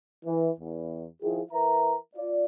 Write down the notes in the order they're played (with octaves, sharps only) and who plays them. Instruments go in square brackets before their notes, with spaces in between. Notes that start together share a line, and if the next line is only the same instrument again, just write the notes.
[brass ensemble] E3
E2
D#3 F3 E4 F4 G#4
E3 A#4 B4 E5 A#5
F4 D5